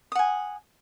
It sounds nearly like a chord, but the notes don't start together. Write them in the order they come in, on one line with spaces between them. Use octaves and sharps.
D#6 F#5 G#5